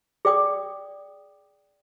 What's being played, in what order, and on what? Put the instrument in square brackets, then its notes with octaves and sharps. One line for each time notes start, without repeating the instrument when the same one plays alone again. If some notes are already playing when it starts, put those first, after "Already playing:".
[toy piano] G#4 D5 G5 D#6